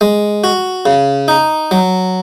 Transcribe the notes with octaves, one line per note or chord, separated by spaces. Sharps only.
G#3
F#4
C#3
D#4
F#3